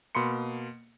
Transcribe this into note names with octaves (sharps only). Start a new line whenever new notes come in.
B2 A#3 B5 C6 C#7